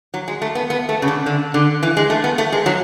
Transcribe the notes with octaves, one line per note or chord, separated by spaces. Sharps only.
F#3
G#3
A3
B3
B3
A3
C#3
D3
D3
D3
E3
G#3
A3
B3
A3
G#3
F#3